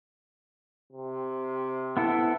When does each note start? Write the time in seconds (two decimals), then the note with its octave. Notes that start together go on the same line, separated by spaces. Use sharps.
0.93 C3
1.97 B3 E4 A4